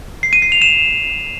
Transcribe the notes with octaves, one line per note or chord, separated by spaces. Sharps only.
C7
D#7
C7
F7
E7